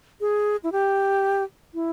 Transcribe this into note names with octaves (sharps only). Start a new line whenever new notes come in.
G#4
E4
G4
E4